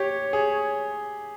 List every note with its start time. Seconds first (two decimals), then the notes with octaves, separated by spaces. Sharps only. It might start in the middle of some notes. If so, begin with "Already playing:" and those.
Already playing: G4 C#5
0.33 G#4